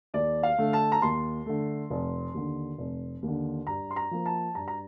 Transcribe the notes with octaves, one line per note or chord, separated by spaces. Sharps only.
D#2 D5
F5
D3 A3
A5
A#5
D#2 C6
D3 A3
F1
D#2 D3
F1
D#2
D3
G2 A#5
C6
A#5
F3 A#3
A5
G2 A#5
A#5